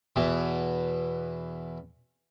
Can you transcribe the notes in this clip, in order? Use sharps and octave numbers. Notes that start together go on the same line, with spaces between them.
E2 B2 E3